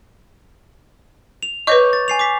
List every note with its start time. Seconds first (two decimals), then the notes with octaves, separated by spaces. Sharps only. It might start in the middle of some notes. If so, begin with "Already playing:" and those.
1.43 F7
1.67 B4 C#5 D#5 C#6 D6 G6
1.93 A6
2.08 G#5 C7 F7
2.19 D6 B6